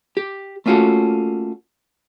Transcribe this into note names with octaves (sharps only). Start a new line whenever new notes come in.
G4
A3 A#3 C#4 F4 F#4 A4